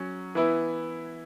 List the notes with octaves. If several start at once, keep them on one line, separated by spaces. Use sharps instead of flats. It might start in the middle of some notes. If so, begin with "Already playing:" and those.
Already playing: F#3 C#4
E3 B3 E4